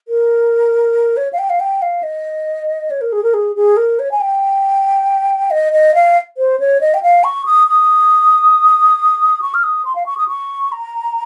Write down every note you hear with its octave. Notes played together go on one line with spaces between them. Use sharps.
A#4
C#5
F5
G5
F5
G5
F5
D#5
C#5
A#4
G#4
A#4
G#4
G#4
A#4
C#5
G#5
G5
D#5
D#5
F5
C5
C#5
D#5
G5
F5
C#6
D#6
D#6
C#6
F6
D#6
C6
F5
C#6
D#6
C#6
A#5